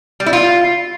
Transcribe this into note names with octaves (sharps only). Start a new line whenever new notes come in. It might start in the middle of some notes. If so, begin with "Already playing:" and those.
G3
E4
F4